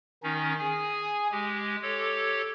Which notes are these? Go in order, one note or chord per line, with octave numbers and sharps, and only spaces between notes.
D#3 C#4 D#4
G#4 G#5
G#3 G4
G4 A4 C#5